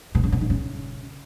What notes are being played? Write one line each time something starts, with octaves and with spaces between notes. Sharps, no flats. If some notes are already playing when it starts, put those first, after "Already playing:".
B2
C#3
B2
D#3
C#3